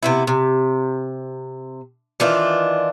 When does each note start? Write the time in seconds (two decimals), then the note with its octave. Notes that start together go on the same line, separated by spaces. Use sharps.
0.03 C3 B3 E4
0.27 C3
2.20 D#3 E3 D4 F4